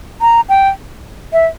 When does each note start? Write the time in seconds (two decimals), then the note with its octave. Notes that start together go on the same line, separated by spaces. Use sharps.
0.21 A#5
0.49 G5
1.33 E5